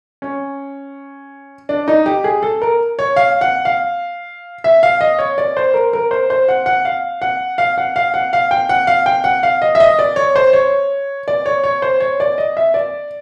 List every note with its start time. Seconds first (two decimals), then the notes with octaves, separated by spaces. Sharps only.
0.22 C#4
1.69 D4
1.88 D#4
2.06 G4
2.24 G#4
2.43 A4
2.62 A#4
2.99 C#5
3.16 F5
3.41 F#5
3.65 F5
4.64 E5
4.83 F5
5.01 D#5
5.19 C#5
5.38 D5
5.57 C5
5.74 A#4
5.93 A#4
6.11 C5
6.30 C5
6.49 F#5
6.66 F#5
6.85 F5
7.22 F#5
7.58 F5
7.78 F#5
7.96 F5
8.14 F#5
8.33 F5
8.51 G5
8.69 F#5
8.87 F5
9.06 G5
9.24 F#5
9.43 F5
9.62 D#5
9.75 E5
9.80 D#5
9.99 D5
10.16 C#5
10.36 C5
10.53 C#5
11.28 D5
11.46 C#5
11.64 C#5
11.82 C5
12.00 C#5
12.20 D5
12.38 D#5
12.57 E5
12.74 D5